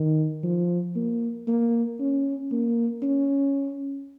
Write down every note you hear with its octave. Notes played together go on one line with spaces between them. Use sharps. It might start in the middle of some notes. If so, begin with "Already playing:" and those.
Already playing: D#3
F3
A#3
A#3
C#4
A#3
C#4